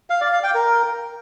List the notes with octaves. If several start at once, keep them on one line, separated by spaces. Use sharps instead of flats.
F5
D5
F5
G5
A#4